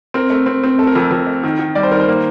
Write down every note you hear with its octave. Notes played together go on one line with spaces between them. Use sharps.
C4 A#4
A3
C4
C4
A3 A4
A#4
F2 A4
F2 A#4
A3
D#3
D#3
G3 D5
C5
D#3 A#4
C5
A#3